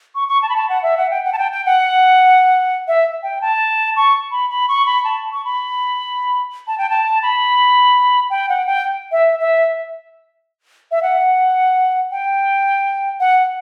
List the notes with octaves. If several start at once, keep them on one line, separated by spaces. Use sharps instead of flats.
C#6
C#6
A5
B5
A5
F#5
E5
F#5
G5
F#5
A5
G5
G5
F#5
E5
G5
A5
C#6
B5
B5
C#6
B5
A5
C#6
B5
A5
G5
A5
B5
G5
F#5
G5
E5
E5
E5
F#5
G5
F#5